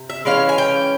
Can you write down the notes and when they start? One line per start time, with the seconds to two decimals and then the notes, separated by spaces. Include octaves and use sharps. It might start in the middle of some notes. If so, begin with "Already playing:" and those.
Already playing: C3
0.10 E5
0.25 E3 G#3 C#4 F5
0.49 G#5
0.58 G5